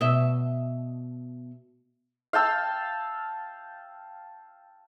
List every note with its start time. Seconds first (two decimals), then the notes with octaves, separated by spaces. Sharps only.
0.01 B2 D#5 E5
2.33 F5 G5 A5 E6